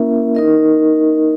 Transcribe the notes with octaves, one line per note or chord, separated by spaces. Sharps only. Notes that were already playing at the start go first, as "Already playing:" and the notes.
Already playing: A#3 C#4 E4 A#4 E5
D#4 A#4 D#5